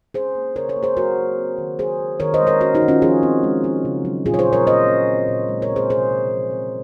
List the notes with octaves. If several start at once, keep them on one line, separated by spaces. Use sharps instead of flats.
C#4 G#4 C5
A#3
C#3 A#4 C#5
A#4 C#5
A#3
G#4 C5
F#3 F#4 A#4
A#3
C4
D#3
F#3 G#4 C5
D#3
D#3 A#4 C#5
C5 D#5
G#3
A#4 C#5
C#4 F#4 A#4
D#4 F#4
D#3
C#4 F4
F3 F4 G#4
C4
G#3
C#4
C#3
F#3
A#2 F4 G#4
C#5
G#4 C5
C#4
A#4 C#5
C#4 C5 D#5
C#4
C4
A#2
G#3
A#4 C#5
C4
G#4 C5
C3 G#4 C5
C3
F3
C4